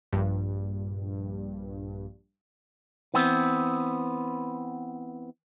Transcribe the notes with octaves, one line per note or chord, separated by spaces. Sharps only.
A#1 G2
E3 B3 C4